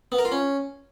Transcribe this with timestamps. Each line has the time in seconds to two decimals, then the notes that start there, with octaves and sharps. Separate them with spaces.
0.12 B3
0.18 A#4
0.25 F4
0.32 C#4